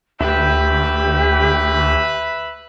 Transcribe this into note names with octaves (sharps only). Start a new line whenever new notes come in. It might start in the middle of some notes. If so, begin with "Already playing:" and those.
D2 G4 B4 E5 B5